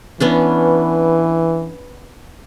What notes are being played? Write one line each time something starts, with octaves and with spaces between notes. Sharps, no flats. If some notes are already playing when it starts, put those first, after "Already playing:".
E3 B3 C#4 D4